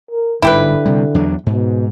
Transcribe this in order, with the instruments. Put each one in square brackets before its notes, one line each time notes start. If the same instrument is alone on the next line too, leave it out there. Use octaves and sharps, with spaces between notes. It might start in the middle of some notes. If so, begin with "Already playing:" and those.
[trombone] A#4
[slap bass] G1 G#2 [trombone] D3 [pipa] E4 G4 B4
[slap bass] C3 G3
E2 F#3 D4
[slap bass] G#2 [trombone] B2